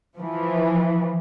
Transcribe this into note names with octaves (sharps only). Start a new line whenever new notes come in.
E3 F3